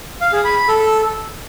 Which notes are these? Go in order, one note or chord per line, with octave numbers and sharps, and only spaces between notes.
F5
G#4
B5
B5
A4